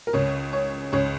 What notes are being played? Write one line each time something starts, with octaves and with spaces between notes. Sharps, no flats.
A#4
C#2 C#3 C#5
C#5
C#2 C#3 C#5